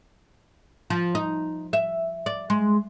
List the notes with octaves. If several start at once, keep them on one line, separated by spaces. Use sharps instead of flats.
F3
D#4
E5
D5
G#3